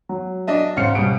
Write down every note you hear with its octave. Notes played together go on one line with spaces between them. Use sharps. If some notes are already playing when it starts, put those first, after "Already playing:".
F#3
D4 D#5 E5
G#2 C#3 C5 F#5 C#7
B2 G3 D7